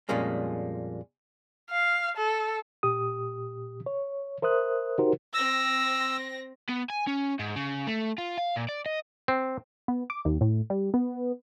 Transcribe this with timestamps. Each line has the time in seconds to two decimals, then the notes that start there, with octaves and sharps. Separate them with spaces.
0.09 F2 A#2 G3 G#3 A#3 C#4
1.70 F5
2.17 A4
2.83 A#2 G4 D#6
3.86 C#5
4.42 A#4 C5 E5 D#6 F#6
4.98 D#4 F#4 G4 A#4 C5
5.34 C4 E6 A#6
6.69 B3
6.90 G#5
7.07 C#4
7.39 G#2
7.56 C#3
7.87 A3
8.18 F4
8.38 F5
8.56 A#2
8.69 D5
8.86 D#5
9.28 C4
9.88 B3
10.10 D6
10.25 D#2
10.41 A2
10.70 G3
10.94 B3